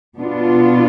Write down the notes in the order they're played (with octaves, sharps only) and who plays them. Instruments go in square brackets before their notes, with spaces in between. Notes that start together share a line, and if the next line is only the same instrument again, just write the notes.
[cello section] B2 B3 D4 F4